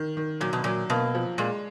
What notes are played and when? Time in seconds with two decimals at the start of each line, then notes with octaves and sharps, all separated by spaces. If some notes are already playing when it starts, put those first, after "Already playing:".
Already playing: D#3
0.17 D#3
0.41 A#2 F#3
0.53 B2
0.64 A#2 F#3
0.90 B2 A#3
1.15 F3
1.38 A#2 G#3